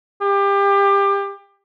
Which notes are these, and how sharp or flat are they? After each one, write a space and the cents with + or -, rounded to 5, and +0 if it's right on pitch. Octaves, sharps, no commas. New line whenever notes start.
G4 +25